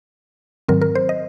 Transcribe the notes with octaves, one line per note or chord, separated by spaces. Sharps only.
G#2 D#3 F#3 C4 A#4
A#4
C5
D#5